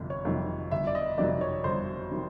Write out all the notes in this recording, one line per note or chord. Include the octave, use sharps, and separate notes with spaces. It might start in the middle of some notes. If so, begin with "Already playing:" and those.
Already playing: G1 F2 C3
C#5
F2 C3 D#3 F#3
G1 E5
D5
D#5
F2 C3 D#3 F#3 D5
C#5
G1 C5
C3 D#3 F#3